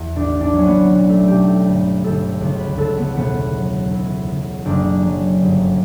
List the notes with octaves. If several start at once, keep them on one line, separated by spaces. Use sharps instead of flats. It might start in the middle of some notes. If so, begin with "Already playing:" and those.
Already playing: E2
A1 D4
D4
F#3 C#4
B3
B1 B3
A3
B1 G4
A4
G1 B4
G1 A4
C#2
B4
C#2 A4
B3
E1 B3
F#3
C#2 E4
C#2
F#1 D4
F#3
G1